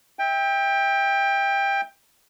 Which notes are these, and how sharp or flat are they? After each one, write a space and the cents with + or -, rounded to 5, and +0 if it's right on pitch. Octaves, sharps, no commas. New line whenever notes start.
E5 -25 G5 +20